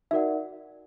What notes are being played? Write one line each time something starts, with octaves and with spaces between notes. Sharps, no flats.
D#4 F#4 A#4 D5 E5 F#5